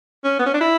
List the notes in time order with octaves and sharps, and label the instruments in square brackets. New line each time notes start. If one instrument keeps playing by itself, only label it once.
[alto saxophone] C#4
B3
C#4
D4
E4